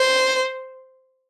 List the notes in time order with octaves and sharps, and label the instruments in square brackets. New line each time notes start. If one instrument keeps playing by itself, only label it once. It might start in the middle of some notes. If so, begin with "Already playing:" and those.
Already playing: [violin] C5